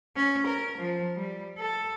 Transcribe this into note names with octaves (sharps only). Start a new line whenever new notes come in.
C#4
A#4
F3
G3
A4